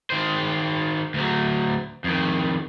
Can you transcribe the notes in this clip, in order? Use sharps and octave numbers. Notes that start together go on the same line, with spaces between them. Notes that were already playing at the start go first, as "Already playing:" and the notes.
D#3 C5
D2 F#3
F2 D#3